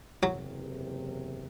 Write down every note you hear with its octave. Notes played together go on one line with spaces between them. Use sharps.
F#1 E2 C3 F#3